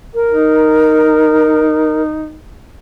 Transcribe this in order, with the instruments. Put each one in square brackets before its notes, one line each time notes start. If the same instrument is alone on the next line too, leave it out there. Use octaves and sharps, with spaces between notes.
[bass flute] A#4
[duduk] D#4